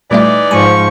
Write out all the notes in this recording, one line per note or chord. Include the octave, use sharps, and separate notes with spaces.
A#2 E3 G3 A3 D#4 D5
G#2 F3 G#5 C#6